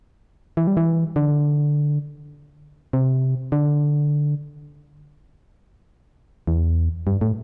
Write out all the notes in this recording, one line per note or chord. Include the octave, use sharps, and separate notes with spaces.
E3
G3
E3
D3
C3
D3
E2
G2
A2